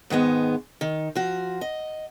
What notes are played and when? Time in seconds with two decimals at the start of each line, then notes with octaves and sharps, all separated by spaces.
0.10 G#2 D#3 G#3 B3
0.81 D#3
1.15 F3 F#4
1.61 D#5